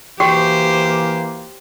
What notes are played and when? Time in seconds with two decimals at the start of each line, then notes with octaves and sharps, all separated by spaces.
0.20 E3 A#3 F#4 G4 C5 G5 C#6